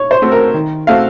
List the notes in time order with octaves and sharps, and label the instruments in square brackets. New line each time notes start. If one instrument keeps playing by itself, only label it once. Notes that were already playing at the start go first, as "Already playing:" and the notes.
Already playing: [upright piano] C#5
C5
[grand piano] A3 C4 F#4 A4
[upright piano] A#4
[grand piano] D#3
[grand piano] A3 C4 F#4 A4 [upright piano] F5